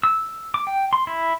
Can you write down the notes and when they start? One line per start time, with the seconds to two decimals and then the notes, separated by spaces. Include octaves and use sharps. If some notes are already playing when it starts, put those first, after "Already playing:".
0.04 E6
0.54 D6
0.67 G5
0.93 C6
1.07 E4